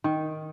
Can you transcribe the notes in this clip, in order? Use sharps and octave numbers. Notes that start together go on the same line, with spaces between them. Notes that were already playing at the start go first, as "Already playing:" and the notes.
D#3